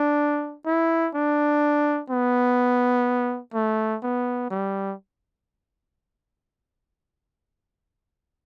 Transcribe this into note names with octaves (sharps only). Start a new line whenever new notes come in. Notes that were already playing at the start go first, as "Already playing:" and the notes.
Already playing: D4
E4
D4
B3
A3
B3
G3